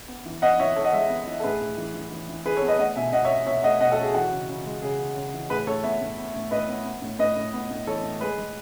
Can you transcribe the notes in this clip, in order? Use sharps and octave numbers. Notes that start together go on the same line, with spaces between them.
B3
E3
B3 D#5 F#5
E3 C#5 E5
E3 A4 C#5
D#5 F#5
G#3 C#5 E5
B3
E3
A4
A2 G#4 B4
A2
E3
E3
E3
E3
E3 G#4 B4
A4 C#5
B3
B4 D#5
A3 D#5 F#5
B2 E5 G#5
B2 D#5 F#5
C#5 E5
C#4
B2 C#5 E5
A3 D#5 F#5
B2 D#5 F#5
F#4 A4
C#4
G#4
E3 F#4
C#3
C#3
G#3
C#3 G#4
C#3
C#3
E3
A2 G#4 B4
A2 A4 C#5
B3 C#5 E5
A2
B3
A2
A2 B4 D#5
B3
B3
A2
A2 B4 D#5
A2
B3
A2
E3 A4 C#5
A2
G#3 G#4 B4
G#3